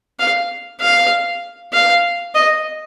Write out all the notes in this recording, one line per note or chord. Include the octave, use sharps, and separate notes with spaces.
F5
F5
F5
D#5